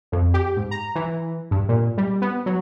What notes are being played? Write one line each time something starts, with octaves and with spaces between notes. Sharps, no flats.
F2
G4
G#2
A#5
E3
G2
A#2
G3
B3
F#3